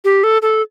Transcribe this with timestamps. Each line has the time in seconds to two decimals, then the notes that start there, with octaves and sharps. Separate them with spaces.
0.05 G4
0.24 A4
0.42 A4